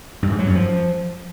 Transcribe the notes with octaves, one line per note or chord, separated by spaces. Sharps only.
G2
G#2
F#3
F#2
F3